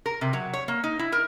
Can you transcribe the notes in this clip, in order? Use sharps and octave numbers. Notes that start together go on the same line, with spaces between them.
A#4
C3
F#3
C#5
A#3
D#4
E4
A#4